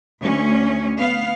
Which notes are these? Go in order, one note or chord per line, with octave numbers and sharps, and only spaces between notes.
D2 C#4
B3 F5